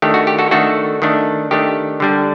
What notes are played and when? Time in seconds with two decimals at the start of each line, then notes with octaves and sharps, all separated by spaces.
0.02 D#3 A3 D4 G4
0.14 F#4
0.27 G4
0.39 F#4 A4
0.51 D#3 A3 D4 F#4 A4
1.02 D#3 A3 D4
1.51 D#3 A3 D4 G4
2.00 D3 G3 D4